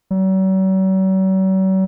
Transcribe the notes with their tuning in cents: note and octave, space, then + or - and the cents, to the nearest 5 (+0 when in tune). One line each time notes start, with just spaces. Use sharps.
F#3 +45